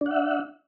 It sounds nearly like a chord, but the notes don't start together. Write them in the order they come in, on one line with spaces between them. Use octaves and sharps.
D4 F#5 E5